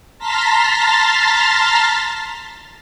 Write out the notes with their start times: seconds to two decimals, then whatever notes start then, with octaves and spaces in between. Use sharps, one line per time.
0.18 A5 A#5 C6 F6 A6 B6